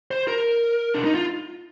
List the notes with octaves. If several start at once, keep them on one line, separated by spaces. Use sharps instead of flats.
C5
A#4
D4
D#4
F4